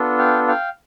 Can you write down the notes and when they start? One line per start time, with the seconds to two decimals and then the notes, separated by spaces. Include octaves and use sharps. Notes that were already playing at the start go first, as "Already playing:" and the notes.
Already playing: B3 D4 F4 A4
0.18 F5 G5
0.48 F5 G5